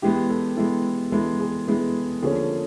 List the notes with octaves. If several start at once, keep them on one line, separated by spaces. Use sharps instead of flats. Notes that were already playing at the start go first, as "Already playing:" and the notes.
E3 G#3 B3 G4
A4
E3 G#3 B3 A4
E3 G#3 B3 A4
G#4
E3 G#3 B3 G#4
D3 F3 A#3 C#4 G#4